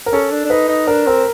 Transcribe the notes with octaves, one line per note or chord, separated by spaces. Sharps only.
A#4
C#4 A4
D4
D4
D#4 B4
D#4
D4 A#4
C4 A#4